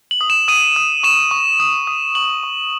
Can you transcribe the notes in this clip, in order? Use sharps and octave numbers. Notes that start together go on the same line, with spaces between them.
F#7
D#6
E7
D#6 D#7
D#6
C#6 E7
C#6
D#6
D#6
C#6 F#7
C#6